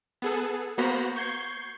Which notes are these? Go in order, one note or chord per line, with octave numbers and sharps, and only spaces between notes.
B3 G#4 A4
A#3 B3 F#4 C5 A#5 B5
C#6 G6 G#6 C7